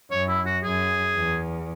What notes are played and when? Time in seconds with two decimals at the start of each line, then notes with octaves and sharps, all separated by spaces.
0.11 F#2 C#5
0.29 E4
0.46 F#4
0.63 F#2 G#4
1.15 E2